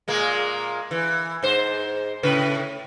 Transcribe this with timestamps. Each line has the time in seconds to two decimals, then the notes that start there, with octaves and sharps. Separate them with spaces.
0.08 A#2 G#3 A#3
0.91 E3
1.43 G#2 C5
2.23 A2 C#3 B4